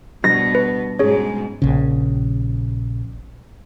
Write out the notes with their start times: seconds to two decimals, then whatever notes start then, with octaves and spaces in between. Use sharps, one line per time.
0.24 B2 G3 B3 D4 A#6
0.55 B4
0.99 G#2 B2 G#3 C#4 G#4 C#5
1.62 A#1 C#3